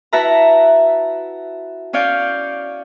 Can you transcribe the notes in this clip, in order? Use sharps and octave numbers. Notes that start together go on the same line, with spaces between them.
E4 F#4 B4 E5 A5 A#5
C#4 C#5 D5 F5 G6